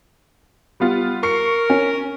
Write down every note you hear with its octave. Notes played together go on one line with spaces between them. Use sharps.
G3 B3 F4
A#4 C#6 C7 C#7
C#4